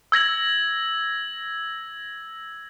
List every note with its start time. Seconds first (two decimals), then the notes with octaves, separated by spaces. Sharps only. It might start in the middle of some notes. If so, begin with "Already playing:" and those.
0.12 E6 G#6 A#6 F#7